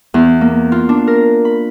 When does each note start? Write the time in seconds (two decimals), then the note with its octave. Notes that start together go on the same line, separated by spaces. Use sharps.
0.14 E2
0.41 A#3
0.72 F4
0.89 D4
1.07 A#4
1.45 B5